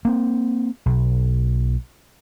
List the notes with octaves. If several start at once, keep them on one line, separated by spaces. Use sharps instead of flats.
A#3 C4
B1